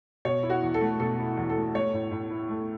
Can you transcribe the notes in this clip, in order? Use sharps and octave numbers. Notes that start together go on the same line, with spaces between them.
B2 C#5
E4
F#4
E2
A4
A3
B2 A4
E4
E2
A4
A3
A3 C#5
A2
A2
E4
A3